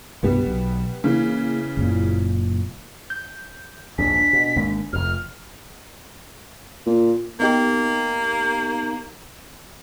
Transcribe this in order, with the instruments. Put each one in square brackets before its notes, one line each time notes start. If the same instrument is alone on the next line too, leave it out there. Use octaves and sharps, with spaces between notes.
[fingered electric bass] C2 G2 B2 [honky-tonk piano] G3 B3
[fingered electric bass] B1
[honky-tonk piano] C#3 E3 [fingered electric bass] A#3
[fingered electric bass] F#1 A#2
[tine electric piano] G6
[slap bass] A#1 D#2 G#2 [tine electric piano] D4 G#5 [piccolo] B6
[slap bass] B2
G#1 G#2 A#3
[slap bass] F1 F2 [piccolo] F6
[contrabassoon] A#2
[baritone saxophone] A#3 [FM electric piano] B3 D#4 G4